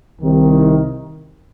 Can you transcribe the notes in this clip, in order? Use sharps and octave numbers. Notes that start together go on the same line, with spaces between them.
C2 C3 D#3